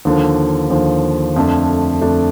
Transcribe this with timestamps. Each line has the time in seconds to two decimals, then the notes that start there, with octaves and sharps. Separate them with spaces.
0.05 D#2 D3 F3
0.70 D#2 D3 F3
1.36 F2 D3 A3 D4
2.01 F2 D3 A3 D4